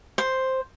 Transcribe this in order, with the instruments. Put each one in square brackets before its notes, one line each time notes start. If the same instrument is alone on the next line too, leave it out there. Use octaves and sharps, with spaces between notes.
[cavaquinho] C5